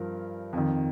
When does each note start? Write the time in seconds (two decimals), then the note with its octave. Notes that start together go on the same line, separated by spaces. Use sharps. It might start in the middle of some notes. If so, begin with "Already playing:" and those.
Already playing: G2 F3 A#4
0.53 F2 D#3